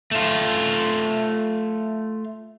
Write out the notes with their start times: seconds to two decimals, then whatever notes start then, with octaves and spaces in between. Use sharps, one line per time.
0.11 A3 F4